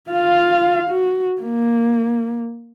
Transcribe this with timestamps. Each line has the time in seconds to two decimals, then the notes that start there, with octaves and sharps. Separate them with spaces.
0.11 F4 F5
0.90 F#4
1.41 A#3